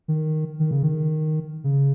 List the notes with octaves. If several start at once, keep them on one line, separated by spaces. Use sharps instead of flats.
D#3
D#3
C#3
D#3
C#3